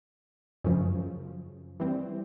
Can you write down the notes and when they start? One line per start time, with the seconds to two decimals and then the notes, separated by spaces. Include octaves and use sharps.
0.64 F#2 C#3 F3
1.80 E3 G3 C4